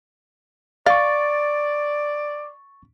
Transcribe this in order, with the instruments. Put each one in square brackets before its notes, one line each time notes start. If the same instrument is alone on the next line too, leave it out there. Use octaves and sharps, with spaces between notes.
[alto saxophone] D5 [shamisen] F5 [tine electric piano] C#6 A6